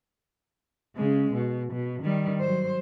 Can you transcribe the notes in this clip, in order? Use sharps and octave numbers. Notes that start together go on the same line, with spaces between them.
C#3 G#3
B2
B2
D#3 G3
F#3 C5